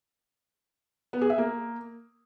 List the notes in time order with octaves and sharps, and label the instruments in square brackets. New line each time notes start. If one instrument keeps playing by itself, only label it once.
[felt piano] B3
G#4
E5
A#3